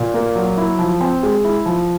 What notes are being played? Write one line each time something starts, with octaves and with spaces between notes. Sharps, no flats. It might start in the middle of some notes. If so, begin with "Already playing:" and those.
Already playing: A#2
A#3
F#3
E4
F3
C4
G#3
E4
F3